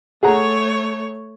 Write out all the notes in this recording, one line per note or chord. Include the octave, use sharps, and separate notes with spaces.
A3 G#4 C#5 F#5 A#5